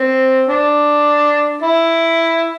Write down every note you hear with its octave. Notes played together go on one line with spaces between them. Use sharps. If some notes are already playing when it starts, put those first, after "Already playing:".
Already playing: C4
D4
E4